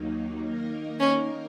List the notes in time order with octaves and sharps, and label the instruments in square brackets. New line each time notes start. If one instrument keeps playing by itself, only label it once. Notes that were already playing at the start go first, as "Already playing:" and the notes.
Already playing: [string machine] D#2 D#3 F#3 A#3 D#4
D#3 A#3 D#4 A#4
[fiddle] C#4